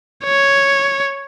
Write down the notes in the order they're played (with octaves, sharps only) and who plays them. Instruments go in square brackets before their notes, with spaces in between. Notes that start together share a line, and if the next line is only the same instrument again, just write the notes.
[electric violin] C#5